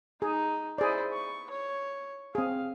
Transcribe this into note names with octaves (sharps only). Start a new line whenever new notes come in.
D#4 G#4
E4 G#4 C5 D5
C#6
C#5
C4 G#4 F5